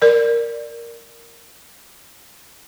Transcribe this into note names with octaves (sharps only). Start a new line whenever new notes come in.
A#4 D5